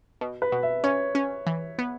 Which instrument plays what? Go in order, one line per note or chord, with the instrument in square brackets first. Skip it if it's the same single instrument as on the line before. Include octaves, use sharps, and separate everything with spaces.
[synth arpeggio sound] B2
[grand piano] B4
[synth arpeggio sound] B2
[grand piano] E5
[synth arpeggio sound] C#4 [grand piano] C#5
[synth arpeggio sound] C#4
E3
B3